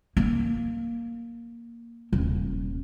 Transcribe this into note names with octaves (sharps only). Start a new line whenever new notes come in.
A#3
D#1